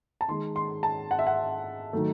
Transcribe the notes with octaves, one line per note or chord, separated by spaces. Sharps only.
A5
D#3 G#3 C6
C6
A5
F#5
E5
F#5
D#3 F#3 A3